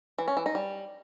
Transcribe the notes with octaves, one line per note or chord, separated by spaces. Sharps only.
E3
C#4
E3
D#4
G3